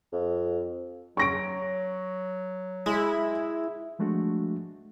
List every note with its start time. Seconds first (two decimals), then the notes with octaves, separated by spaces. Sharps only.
0.12 F2
1.17 F#3 C#6 A#6 D7
2.86 G#3 E4
3.99 F3 G#3 A3 D4 F#4